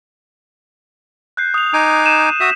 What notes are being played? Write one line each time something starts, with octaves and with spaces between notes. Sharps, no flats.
F#6 G6 C7
D#6 F7
D#4 G#5 D6
D#6 D#7 E7
F#4 E5 D#6 B6